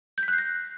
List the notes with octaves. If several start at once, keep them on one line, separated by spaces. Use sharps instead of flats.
G6
B6
F#6
C7
A#6